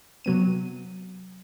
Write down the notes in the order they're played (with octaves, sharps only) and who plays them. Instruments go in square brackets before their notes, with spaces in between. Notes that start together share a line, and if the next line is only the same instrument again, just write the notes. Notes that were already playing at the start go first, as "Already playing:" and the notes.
[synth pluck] C3 F#3 B3 D#7